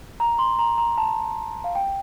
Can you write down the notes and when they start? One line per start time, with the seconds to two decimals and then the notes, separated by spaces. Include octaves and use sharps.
0.20 A#5
0.39 C6
0.59 A#5
0.78 A#5
0.98 A5
1.64 F5
1.75 G5